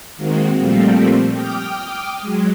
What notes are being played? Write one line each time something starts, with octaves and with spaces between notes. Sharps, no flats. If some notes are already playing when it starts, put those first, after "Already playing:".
D#3 G#3 A#3 C4 F#4
A#2 F3 G3 A3 A#3 C4
G5 D6 D#6 F6
F#3 G#3